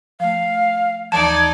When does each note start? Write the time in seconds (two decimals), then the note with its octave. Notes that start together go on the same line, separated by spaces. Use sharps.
0.20 F3 A3 F5
1.12 D#2 E3 F3 D#4 D5 A5 G#6